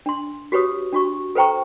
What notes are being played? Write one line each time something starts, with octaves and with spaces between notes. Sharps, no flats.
D4 C6
F#4 G4 B4 C#5 D#6
D4 F#4 C#6
A4 B4 C5 G5 A#5 C#6